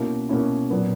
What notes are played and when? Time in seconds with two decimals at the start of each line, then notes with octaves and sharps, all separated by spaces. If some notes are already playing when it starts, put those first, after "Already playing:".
Already playing: B2 A#3 C#4 E4
0.29 B2 A#3 C#4 E4
0.70 A#2 F#3 B3